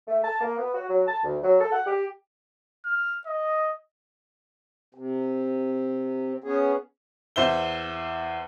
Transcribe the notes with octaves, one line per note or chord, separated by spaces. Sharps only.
A3
A5
A#3
B3
F#4
F#3
A5
D2
F#3
A4
F#5
G4
F6
D#5
C3
B3 C#4 G#4
E2 C5 E5 G7